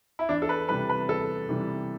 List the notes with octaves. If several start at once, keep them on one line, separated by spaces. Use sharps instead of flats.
E4
E2 D4
A4
B4
C3 E3 G3 B4
B4
E2 A4
C3 E3 G3